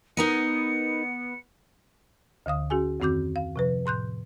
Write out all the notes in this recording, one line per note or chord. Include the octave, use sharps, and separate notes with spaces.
B3 D#4 A#4 D#5 C#7
D2 D3 F5 D#6
C#4 F#4 G#4 G#5
F2 D#3 C4 F#4 D6 G6
F5
C3 F3 B4
A2 C6 F#6 G6